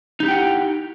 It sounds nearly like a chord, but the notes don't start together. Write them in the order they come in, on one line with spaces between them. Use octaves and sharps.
D#4 G4 E4 G5 F#5